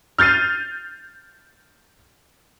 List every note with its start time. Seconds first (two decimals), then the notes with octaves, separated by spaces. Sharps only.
0.18 F6 G6 A6 C7 D#7